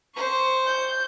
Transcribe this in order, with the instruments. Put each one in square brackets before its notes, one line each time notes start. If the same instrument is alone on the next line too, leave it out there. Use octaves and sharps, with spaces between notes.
[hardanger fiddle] C5 C#6
[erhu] G6